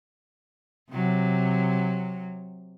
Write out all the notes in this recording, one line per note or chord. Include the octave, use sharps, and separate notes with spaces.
C3 F#3